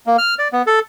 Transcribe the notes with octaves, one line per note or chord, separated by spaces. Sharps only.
A#3
F6
D5
B3
A4